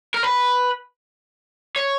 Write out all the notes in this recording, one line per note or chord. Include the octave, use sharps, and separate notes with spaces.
A#4
B4
C#5